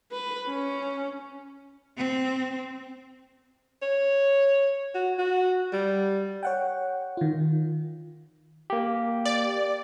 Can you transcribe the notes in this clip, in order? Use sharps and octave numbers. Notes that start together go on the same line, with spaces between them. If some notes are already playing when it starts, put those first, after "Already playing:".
B4
C#4
C4
C#5
F#4
F#4
G3
C#5 F#5 G5
D#3 F4
A#3 G4
D5